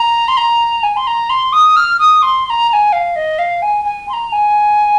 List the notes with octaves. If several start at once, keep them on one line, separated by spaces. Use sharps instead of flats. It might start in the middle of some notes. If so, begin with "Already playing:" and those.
Already playing: A#5
C6
A#5
G#5
C6
A#5
C6
D#6
F6
D#6
C6
C6
A#5
A#5
G#5
F5
D#5
F5
G#5
G#5
C6
A#5
G#5